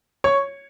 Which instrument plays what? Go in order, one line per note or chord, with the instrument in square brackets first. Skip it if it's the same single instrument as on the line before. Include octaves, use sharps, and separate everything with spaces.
[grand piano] C#5 C#6